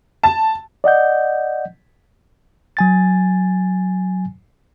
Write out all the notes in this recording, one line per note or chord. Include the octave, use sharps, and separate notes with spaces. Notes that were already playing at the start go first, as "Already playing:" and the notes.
A5
D5 D#5 F#5 G6
F#3 G#5 A6